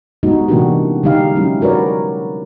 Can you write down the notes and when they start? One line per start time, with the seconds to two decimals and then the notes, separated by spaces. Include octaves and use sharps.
0.23 G3 G#3 B3 D#4 F#4
0.48 C3 E3 A#3 D4 F#4 G4
1.03 D3 G3 G#3 D#4 G4 F5
1.35 F#3 G#3 C#4 E4
1.61 F#4 A#4 B4 C#5 D5